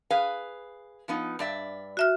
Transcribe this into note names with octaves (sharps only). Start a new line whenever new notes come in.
G#4 B4 F5
F3 B3 D#4
G2 D5 E5
F#4 E5 F6